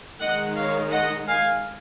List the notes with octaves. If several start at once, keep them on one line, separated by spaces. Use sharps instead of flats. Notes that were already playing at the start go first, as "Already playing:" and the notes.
D#3 G#3 D#4 D#5 F#5
C#5 F5
D#5 F#5
F5 G#5